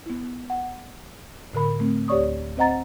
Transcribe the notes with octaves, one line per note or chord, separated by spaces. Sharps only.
B3 E4
F#5
A2 D3 A#4 B5
A3 C4
D2 G4 C#5 D5 C#6 D#6
C4 C5 D#5 F#5 A#5 A6